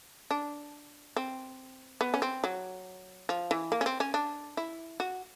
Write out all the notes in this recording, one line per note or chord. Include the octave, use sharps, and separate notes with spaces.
D4
C4
B3
C#4
C4
F#3
F3
E3
A#3
C#4
C4
C#4
D4
E4
F#4